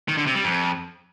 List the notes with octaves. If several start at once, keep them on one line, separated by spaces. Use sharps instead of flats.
D#3
D3
C3
G3
F2